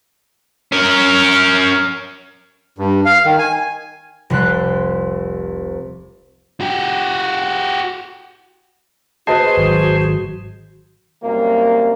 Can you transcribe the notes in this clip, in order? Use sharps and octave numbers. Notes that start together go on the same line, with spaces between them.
C#4 A#4
G2
F5
D#3
G#5
F1 C2 C6 F#6 B6
F#4 G4
F#4 G#4 B4 C5 D#5 A5
G#1 F#3
C2 F#2 A#3